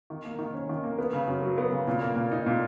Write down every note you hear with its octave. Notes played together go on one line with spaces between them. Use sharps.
D#3
A#3
D#3
C#4
D#3
A#3
B3
C#3
F#2
F#3
B3
C#3
A#2
A#3
A#2
D#4
A#2